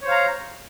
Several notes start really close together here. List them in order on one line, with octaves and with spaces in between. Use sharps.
C#5 C5 F5 A#5